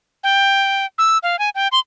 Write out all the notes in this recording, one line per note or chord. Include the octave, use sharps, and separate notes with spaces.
G5
E6
F5
G#5
G5
C6